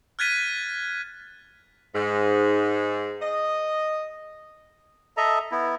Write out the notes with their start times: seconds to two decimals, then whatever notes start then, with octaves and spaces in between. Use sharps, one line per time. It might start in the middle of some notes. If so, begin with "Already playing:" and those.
0.19 F6 F#6 G#6 A6 B6 D#7
1.94 G#2
3.20 D#5
5.17 A4 D#5 E5 A#5
5.52 B3 E4